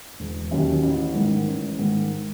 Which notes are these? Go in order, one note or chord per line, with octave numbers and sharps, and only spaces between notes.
E1
D#2 D#3 F#3 C#4
A1
G#2 D#3
A1
G#2 D#3